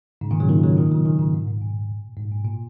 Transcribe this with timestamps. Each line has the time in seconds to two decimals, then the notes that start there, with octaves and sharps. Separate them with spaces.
0.21 G#2 C#3
0.31 A#2 D#3
0.40 C#3 F#3
0.49 A#2 D#3
0.63 C#3 F#3
0.77 A#2 D#3
0.91 C#3 F#3
1.05 A#2 D#3
1.19 G#2 C#3
1.34 G#2
1.47 G#2
1.62 A#2
2.17 G#2
2.32 A#2
2.45 A#2